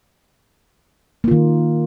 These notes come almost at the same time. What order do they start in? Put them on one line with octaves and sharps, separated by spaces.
A#3 F4 D#3